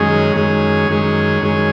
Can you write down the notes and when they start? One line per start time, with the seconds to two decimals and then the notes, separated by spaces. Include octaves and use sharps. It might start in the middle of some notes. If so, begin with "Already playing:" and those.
Already playing: F#2 D#3 G#3 C#4 G#4
0.36 F#2 D#3 G#3 C#4 G#4
0.89 F#2 D#3 G#3 C#4 G#4
1.42 F#2 D#3 G#3 C#4 G#4